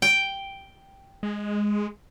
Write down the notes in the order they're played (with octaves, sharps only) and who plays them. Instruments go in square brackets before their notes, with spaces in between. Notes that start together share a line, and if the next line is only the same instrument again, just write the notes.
[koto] G5
[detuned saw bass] G#3